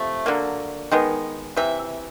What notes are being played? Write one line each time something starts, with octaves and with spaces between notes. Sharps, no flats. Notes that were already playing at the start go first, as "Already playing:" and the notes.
Already playing: C3 F3 A3
D3 F#3 A#3
D#3 G#3 B3
C3 E3 E5